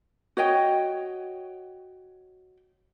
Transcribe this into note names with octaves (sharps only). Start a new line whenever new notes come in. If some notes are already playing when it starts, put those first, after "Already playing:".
F#4 C#5 D#5 G5